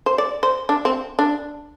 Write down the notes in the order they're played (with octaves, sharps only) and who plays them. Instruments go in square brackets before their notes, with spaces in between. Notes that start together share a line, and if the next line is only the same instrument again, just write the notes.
[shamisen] C5
D5
C5
D4
C4
D4